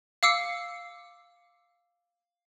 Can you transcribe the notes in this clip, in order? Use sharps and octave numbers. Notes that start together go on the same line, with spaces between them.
F5 D6 E6 C7 C#7